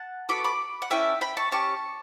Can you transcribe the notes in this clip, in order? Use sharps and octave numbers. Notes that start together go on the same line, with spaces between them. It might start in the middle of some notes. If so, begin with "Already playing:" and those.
Already playing: F#5 A5
B3 F#4 A4 B5 D6
B5 D6
F#5
C#4 E4 A4 E5 G5
G5 B5
A5 C#6
C#4 G4 A5 C#6